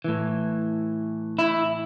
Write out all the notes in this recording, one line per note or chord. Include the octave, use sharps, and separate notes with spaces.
A2 E3
E4